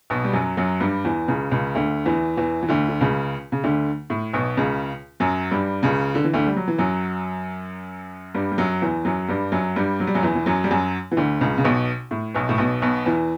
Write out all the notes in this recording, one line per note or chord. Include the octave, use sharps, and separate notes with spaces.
B1 B2
G3
F#2 F#3
F#2 F#3
G2 G3
E2 E3
C#2 C#3
C#2 C#3
D2 D3
E2 E3
E2 E3
E3
D2 D3
D3
C#2 C#3
C#3
D2 D3
A2
B1 B2
C#2 C#3
F#2 F#3
G2 G3
C#2 C#3
D3
E3
D2 D3
G3
F#3
E3
F#2 F#3
G2 G3
G3
F#2 F#3
E2 E3
F#2 F#3
G2 G3
F#2 F#3
G2 G3
F#3
G3
F#2 F#3
E2 E3
E3
F#2 F#3
G3
F#2 F#3
E3
D2 D3
C#2 C#3
C#3
B1 B2
A2
B1 B2
A2
B1 B2
B1 B2
E2 E3